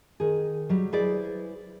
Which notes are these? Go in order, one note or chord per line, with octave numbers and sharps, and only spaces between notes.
D#3 G#4
F#3 G3
E4 G#4 B4 C5 D5